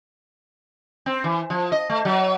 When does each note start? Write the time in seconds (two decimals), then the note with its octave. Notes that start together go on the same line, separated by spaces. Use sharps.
1.06 C4
1.24 E3
1.50 F3
1.72 D#5
1.89 A3
2.05 F#3